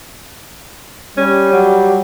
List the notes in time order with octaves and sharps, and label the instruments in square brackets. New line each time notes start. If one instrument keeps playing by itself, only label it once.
[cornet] G3 [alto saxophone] C#4
[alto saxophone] F#3